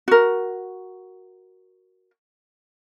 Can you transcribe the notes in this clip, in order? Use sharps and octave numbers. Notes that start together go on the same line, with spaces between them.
F#4 A#4